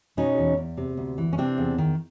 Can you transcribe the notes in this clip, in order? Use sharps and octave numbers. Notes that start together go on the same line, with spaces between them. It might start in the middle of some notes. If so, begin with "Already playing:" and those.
B2 C#4 D#4
E2
E2
C3
D2
E3
C#4
C3 C4 D4
E2
D#3